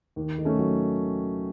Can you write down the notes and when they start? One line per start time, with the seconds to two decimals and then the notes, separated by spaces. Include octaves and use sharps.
0.16 D#2
0.38 D#3
0.45 A3 C#4
0.59 F#3